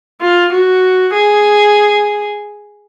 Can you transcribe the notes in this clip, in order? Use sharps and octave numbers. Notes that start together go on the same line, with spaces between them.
F4
F#4
G#4